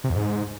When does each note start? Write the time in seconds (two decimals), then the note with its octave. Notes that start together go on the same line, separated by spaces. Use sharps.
0.04 C3
0.10 E2
0.16 G#2